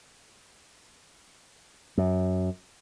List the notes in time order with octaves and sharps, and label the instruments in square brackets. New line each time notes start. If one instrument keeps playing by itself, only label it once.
[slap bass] F#2